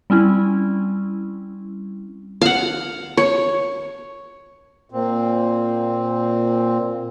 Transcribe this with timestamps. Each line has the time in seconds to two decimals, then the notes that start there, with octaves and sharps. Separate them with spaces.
0.10 G3 C4 C#4 E4
2.41 F5 F#5
3.17 C#5
4.90 A#2 C4